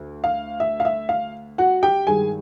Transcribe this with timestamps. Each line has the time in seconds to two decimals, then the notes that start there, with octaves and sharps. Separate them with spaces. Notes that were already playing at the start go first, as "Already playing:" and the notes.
Already playing: D2
0.24 F5
0.60 E5
0.80 F5
0.85 E5
1.09 F5
1.58 F#4 F#5
1.83 G4 G5
2.07 G2 D#3 G#3 G#4 G#5